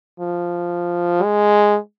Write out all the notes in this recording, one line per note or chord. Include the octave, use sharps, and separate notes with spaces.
F3
G#3